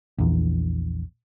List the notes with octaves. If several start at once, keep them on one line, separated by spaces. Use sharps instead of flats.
A#1 E2